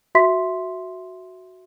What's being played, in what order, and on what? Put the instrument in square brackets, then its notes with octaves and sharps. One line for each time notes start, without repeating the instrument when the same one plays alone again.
[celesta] F#4 E5 C6 B6